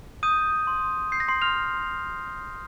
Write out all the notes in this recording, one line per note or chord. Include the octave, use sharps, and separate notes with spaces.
D#6 G6 D#7
C6
G6 C7
A#6
C6 C7
F6 F7